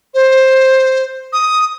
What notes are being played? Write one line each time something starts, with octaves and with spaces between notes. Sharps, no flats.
C5
D#6